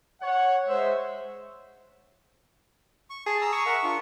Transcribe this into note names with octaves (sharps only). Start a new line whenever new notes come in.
C#5 F#5
G#3 C5 C#5 E5
C#6
G#4 A5 C#6
A#5 D#6 E6
C#6
A#4 E5 F#5
D4 F4